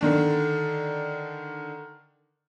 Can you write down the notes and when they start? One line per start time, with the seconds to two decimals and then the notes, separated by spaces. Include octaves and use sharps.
0.01 D3 D#3 D4